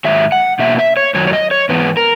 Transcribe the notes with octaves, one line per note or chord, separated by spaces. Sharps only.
G#2 D#3 F#3 E5
F#5
B2 A#3 E5
E5
C#5
F#2 D#3 F#3 C#5
C#5
D#5
C#5
G#2 E3 B3 B4
A#4